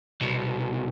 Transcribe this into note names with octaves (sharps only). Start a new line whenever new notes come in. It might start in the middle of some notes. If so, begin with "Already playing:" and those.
C2 B2